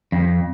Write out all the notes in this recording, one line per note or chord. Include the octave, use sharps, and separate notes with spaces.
F2